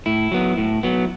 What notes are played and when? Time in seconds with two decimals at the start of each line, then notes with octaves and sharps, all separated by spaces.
0.06 A2 E4
0.32 F#3 B3
0.58 A2
0.83 F#3 B3